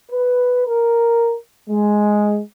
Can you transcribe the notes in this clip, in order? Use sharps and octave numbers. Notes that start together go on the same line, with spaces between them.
B4
A#4
G#3